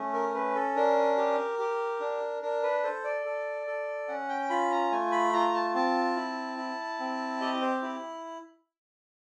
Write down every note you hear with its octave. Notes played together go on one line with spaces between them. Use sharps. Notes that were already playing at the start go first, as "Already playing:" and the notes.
Already playing: A3 C#4
A#4
C#4 B4
A4
D4 A#4
G4
G4
D4
D4 A#4
B4
A4 C5
D5
A4
A4
C#4 F#5
G5
F4 B5
A#5
A3 G#5
B5
F4 A#5
A5
C4 A5
E4
E4
C4
G4 D#5
C5
E4